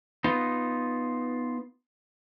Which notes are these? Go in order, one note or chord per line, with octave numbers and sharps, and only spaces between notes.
B3 D#4 F4